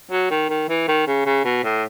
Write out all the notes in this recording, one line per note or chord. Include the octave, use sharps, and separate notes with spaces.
F#3
D#3
D#3
E3
D#3
C#3
C#3
B2
A2